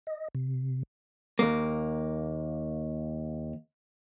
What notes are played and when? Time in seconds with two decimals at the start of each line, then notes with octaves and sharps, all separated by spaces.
0.07 D#5
0.35 C3
1.39 D#2 A#3